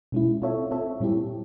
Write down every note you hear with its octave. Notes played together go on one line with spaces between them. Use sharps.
B2 G#3 C#4 E4
C4 F4 A4 C#5 E5
C4 F4 A4 C#5 E5
A#2 G3 C4 E4 G4